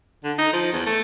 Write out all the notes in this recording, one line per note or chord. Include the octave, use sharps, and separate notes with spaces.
D3
D#4
F3
E2
A3